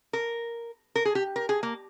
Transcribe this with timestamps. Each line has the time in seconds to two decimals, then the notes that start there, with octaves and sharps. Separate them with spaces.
0.13 A#4
0.95 A#4
1.05 G#4
1.15 G4
1.36 A#4
1.49 G#4
1.63 A#3